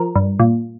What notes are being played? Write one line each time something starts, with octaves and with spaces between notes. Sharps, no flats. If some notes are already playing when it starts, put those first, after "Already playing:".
Already playing: F3 A#4
G2
A#2